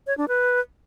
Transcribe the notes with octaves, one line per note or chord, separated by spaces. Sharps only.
C#5
D4
B4